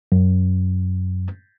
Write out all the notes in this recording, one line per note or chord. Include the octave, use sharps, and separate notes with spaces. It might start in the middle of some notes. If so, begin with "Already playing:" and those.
F#2